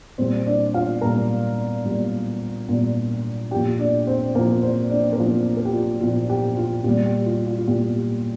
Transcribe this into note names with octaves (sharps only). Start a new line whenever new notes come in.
A#2 G3 C4 C5
D4 D5
F4 F5
A#2 G3 A#4 A#5
A#2 G3
A#2 G3
A#2 F3 G4 G5
D4 D5
C4 C5
A#2 F3 A#3 A#4
C4 C5
D4 D5
A#4
A#2 F3 C4 C5
A#4
G4
F4
A#2 F3 F4
G4
F4
A#2 G3 G4
G4
F4
F4
F4
A#2 G3 G4
G4